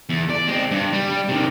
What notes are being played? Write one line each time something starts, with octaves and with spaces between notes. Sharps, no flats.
E2
D5
G#3 C4
G2
G3
C3 D#3